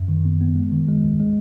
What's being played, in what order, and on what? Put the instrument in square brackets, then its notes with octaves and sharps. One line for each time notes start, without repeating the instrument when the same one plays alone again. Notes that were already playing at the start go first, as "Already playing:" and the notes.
Already playing: [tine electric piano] F#2
D#3
B3
B3
G#3
D#3
G#3
C#2
G#3